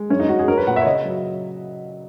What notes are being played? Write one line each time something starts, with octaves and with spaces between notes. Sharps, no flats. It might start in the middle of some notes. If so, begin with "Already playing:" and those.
Already playing: G#3
F#2 C#4
D#4
F#2 F#4
G#4
C#4 A#4
B4
A#2 F#5
E5
C#5
C#3 D#5
F#3